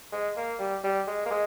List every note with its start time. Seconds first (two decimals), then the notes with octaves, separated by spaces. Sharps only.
0.12 G#3
0.37 A#3
0.59 G3
0.84 G3
1.07 G#3
1.26 A#3
1.31 G#3